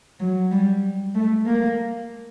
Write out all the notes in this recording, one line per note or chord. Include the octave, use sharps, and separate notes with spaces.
F#3
G3
A3
A#3